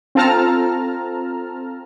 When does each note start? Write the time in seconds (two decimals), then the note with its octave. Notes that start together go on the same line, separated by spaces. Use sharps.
0.15 C4 F4 A4 A5 A#5 F6